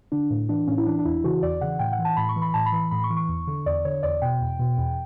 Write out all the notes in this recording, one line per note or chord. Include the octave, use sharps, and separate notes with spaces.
D3 D4
A2
E3 D4
A2 C#4
E4
E3 D4
D4
E2 E4
C#3 E3 F#4
E2 D5
C#3 E3 F#5
A2 G5
F#5
E3
A5
A2 B5
C#6
E3
B5
A2 A5
B5
E3
A2 B5
C#6
E3
C#6
E2
D3
E2 D5
D3 C#5
E2 D5
B2 G5
E2
B2
E2